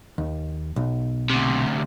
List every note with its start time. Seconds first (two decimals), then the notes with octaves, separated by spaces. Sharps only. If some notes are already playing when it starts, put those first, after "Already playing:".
0.18 D#2
0.76 B1
1.30 D2 C3